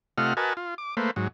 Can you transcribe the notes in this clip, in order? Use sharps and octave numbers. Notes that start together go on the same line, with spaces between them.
C3 A3 F4 D#5 F#5 F6
F#4 A#4 B4 D#5 G#5 A5
F4
D6
A3 A#3 B4 C5
G#2 F#3